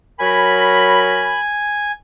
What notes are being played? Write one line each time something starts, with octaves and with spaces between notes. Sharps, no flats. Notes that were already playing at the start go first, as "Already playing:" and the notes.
F#3 A#4 G#5 B5